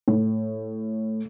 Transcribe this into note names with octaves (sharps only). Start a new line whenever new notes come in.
A2